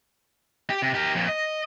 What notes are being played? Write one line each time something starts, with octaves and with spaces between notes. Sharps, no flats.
G4
C3
G4 A#4
F2 A#2
D#5